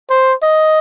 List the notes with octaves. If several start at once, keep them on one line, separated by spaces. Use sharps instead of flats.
C5
D#5